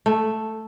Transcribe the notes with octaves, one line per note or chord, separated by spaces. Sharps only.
A3